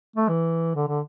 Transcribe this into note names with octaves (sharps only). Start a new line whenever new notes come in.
A3
E3
D3
D3